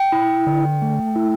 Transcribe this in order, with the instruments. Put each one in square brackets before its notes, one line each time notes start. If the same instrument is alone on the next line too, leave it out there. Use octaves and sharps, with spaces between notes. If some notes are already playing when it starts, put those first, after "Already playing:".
Already playing: [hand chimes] G5
[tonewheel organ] E4
D3
A3
E4